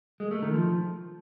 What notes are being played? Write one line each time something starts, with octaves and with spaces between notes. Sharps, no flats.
G#3
A3
D#3
F3